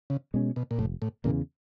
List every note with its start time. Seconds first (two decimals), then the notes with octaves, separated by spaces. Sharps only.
0.10 C#3
0.34 B2 G#3 C#4
0.56 B2
0.71 A#2
0.78 F1 A2
1.02 A2
1.24 E2 A#2 C#3 E3